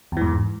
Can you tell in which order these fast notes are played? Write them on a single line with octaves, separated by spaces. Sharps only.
E2 E3 G#2